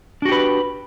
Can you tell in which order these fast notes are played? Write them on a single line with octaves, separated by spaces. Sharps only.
D4 F#4 G4 B4